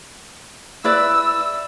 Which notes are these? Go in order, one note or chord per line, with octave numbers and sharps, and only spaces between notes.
E4 B4 D5 E6